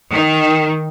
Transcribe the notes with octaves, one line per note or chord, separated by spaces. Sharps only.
D#3